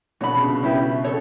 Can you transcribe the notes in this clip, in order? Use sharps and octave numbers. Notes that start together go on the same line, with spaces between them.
B2 D3 F#4 C#5 G5 B5
C#3
C#3
C#4 E4 G4 B4
C#3 A4 C#5